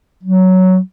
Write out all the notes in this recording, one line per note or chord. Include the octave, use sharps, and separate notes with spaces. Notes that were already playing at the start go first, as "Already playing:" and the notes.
F#3